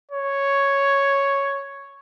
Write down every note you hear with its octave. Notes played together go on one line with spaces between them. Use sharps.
C#5